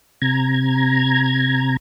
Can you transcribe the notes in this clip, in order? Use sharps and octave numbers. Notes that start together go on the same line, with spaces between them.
C3 A#5 G#6